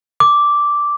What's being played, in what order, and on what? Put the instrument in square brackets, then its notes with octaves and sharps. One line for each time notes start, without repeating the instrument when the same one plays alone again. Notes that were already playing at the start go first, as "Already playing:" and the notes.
[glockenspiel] D6